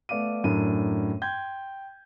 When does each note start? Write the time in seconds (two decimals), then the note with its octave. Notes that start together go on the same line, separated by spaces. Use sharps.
0.09 A3 B3 D5 F5 D6 D#7
0.44 F#2 A2 D4 A#4 D#7
1.22 G5 C6 G6 G#6